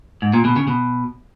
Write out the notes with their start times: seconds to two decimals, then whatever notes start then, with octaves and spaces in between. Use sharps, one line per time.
0.22 G#2
0.33 A#2
0.45 B2
0.56 C#3
0.68 B2